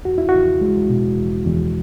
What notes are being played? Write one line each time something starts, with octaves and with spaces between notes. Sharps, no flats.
E2 F#4
E4
F#4
E2
G#3
B2
E2
E2